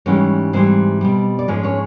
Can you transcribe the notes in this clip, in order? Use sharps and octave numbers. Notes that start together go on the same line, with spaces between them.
G#2 E3 G3 C#4 C#5
G#2 E3 G3 C4 C5
B2 G3
D5
G#2 F3 G#3 C#4 C#5
C#4 C#5